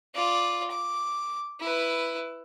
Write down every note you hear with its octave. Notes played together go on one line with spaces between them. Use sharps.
F4 D5
D6
E4 B4